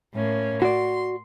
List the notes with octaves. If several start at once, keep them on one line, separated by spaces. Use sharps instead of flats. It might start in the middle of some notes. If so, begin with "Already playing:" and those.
A2 A#3 C#4
F#4 D5 C6